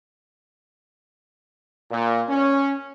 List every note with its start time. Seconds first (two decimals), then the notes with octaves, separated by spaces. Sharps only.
1.90 A#2
2.28 C#4